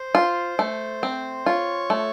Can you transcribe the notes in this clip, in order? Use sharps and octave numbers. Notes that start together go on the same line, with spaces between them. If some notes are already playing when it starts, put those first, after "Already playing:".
Already playing: C5
F4
A3
C4
F4 C#5
A3